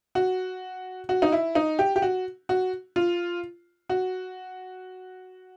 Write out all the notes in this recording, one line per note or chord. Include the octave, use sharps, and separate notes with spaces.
F#4
F#4
D#4
E4
D#4
G4
G4
F#4
F#4
F4
F#4